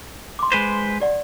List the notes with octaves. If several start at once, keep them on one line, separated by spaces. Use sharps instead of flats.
C6 D6
G#3 B4 C5
G4 D5 F#5